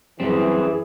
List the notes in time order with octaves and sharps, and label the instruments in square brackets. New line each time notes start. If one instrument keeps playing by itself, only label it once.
[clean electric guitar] F#2 G3 C4 [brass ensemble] E3 [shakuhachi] G#4